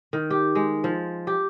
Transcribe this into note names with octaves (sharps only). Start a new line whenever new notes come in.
D#3
G4
G#3
F3
G4